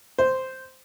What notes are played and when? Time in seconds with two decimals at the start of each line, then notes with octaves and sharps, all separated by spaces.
0.18 C5